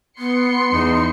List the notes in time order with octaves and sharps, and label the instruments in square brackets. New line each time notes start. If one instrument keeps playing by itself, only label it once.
[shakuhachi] B3 [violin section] C6 C#7
[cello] E2 [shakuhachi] D#4